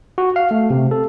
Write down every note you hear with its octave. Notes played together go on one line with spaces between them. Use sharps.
F#4
F5
A3
C3
A4